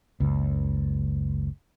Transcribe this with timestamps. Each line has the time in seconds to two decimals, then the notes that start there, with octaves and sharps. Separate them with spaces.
0.20 F#1 C#2